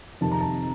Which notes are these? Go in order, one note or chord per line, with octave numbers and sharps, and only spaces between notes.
F2 C3 D#3 A5
A#5
A5